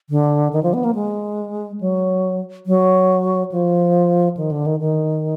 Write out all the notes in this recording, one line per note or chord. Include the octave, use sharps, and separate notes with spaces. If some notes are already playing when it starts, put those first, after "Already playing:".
D3
D#3
F3
B3
A#3
G#3
F#3
F#3
F3
D#3
D3
D#3
D#3